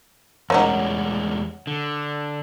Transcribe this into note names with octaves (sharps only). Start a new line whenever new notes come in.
E2 G3 G#3 A#3 C#4 D#4 C#5 F#5
D3